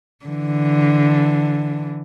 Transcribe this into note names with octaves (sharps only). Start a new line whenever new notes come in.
D3 E3